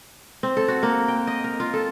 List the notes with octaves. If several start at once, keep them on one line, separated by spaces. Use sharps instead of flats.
C4
A4
F#4
A#3
G5
D#5
A#4
F4
A4